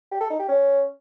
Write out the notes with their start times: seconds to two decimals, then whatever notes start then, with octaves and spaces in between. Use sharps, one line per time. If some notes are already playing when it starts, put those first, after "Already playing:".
0.11 G4
0.21 A4
0.30 D#4
0.39 G4
0.49 C#4